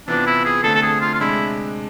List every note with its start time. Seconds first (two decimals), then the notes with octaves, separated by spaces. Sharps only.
0.08 C3 E3 B3 D4 F4 B4
0.27 E4
0.45 G#4
0.64 D3 A3 C4 A4
0.74 A4
0.83 G#4
1.01 F4
1.15 F4
1.21 C3 G#3 D4 E4